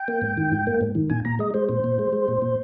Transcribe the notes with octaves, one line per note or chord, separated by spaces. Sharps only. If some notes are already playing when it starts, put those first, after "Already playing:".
Already playing: G5
A#3
G#2
D#3
G#2
A#3
G#2
D#3
A#2 G#5
A#2 A#5
G#3 D#5
G#3 C5
A#2 C5
A#2
G#3
G#3
A#2
A#2